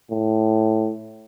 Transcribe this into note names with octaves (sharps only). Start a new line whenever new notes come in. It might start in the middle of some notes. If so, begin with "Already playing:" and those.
A2